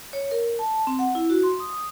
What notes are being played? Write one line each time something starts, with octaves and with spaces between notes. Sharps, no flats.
C#5
A#4
A5
C4
F#5
E4
F#4
C6
D#6